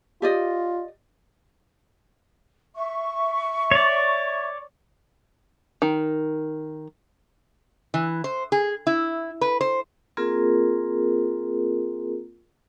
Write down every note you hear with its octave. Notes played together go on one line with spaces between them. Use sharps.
F4 G4 D5 D#5
E5 C#6
C#5 D5
D#3
E3
C5
G#4
E4
B4
C5
A#3 C4 F4 G#4 A#4